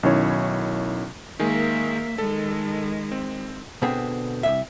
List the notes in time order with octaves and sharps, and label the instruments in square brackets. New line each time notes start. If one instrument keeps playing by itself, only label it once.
[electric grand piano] B1 D#3 C#4 E4 C#5
[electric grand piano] D#3 G#3 G#5 [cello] A#3 E5
[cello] D#3 G#3 [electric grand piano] A4
[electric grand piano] C4
[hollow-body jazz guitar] B2 D3 B3 C4 G#4
C2 A#2 E5